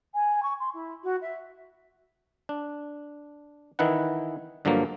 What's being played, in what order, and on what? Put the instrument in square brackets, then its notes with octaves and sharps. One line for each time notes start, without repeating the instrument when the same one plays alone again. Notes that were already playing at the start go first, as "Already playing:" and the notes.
[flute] G#5
C#6
C6
E4
F#4
E5
[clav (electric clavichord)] D4
D#3 E3 D#4 E4 B4 F#5
G2 D3 F3 F#3 A#3